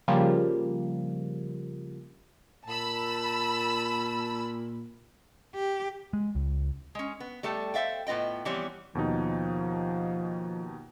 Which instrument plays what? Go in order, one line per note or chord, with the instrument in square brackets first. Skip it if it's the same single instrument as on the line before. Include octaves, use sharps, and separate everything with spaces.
[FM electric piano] C#3 F3 G3 A#3
[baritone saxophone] A#2 [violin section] A5 B5 E6
[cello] G4
[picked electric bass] G#3
C#2
[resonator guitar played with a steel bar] G#3 C#4
B3
G3 A3 A4 G5 A5
A4 C5 E5 F5 G5
A2 B3 F4 D#5 G5
E3 F3 G3 B3 C4 C#5
[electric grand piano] D#2 B2 D#4 [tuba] F3